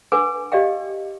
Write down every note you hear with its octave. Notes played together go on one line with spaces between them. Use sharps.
D4 A4 B4 F#5 G#5 D6
G4 D5 D#5 F5 G5